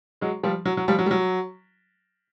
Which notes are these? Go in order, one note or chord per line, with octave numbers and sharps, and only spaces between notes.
F#3 G#3
F3 G3
F#3
F#3
F3 G3
F#3
G3
F#3